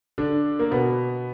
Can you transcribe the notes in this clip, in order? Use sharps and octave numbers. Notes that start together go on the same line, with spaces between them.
D3 D4
A#3
B2 B3